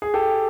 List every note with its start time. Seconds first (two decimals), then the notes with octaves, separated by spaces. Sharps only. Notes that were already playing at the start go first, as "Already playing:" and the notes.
0.02 G#4
0.14 G4 A4